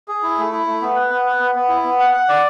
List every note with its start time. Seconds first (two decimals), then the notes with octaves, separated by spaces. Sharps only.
0.08 G#4
0.23 E4
0.38 A3
0.52 E4
0.67 A3
0.82 B3
0.96 B4
1.10 B3
1.26 B4
1.40 B3
1.55 B3
1.69 E4
1.84 B3
1.99 F#5
2.14 F#5
2.29 D5